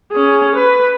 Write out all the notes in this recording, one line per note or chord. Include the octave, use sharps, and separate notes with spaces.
C#4 G#4
B4